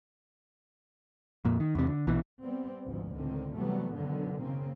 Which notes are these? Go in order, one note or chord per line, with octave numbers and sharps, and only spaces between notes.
F2 A#2
D#3
E2 C3
D3
A#1 B2 E3
G3 B3 C4
G#1 D2 G#2 B2 F3
C#2 A2 D3 D#3 C4
C3 E3 F#3 G3 A3 B3
F#2 B2 D3 D#3 F#3 B3
C#3 A#3 C4